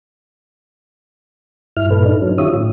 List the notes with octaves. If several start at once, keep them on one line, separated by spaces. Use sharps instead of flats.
G2 E4 F6
G2 A#2 A4 B4
D4 D#4
F#3 C#4
D#3 F4 G4 C#5 E5 D#6
A2